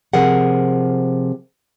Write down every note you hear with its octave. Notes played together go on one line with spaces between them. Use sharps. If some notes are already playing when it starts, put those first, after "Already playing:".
C3 F3 G#4 A#4 F#5